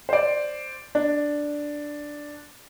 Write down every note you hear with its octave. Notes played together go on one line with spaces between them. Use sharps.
C5 D5
D4